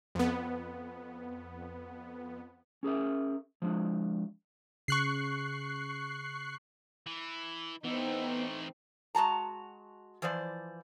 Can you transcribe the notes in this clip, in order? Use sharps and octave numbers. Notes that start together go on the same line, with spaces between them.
F2 B3
C#4 G#4 A#4 E5
F3 G#3 D4
C#3 C#6 F#6 C7
E3
E3 A3 B3 C4 D#4
G#3 F#4 A5 A#5
E3 F3 C5 D5